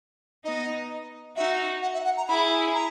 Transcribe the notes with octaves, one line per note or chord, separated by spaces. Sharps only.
B3 D#4 D#5
D#4 F#4 E5
F#5
E5
F#5
A#5
E4 G#4 B5
A#5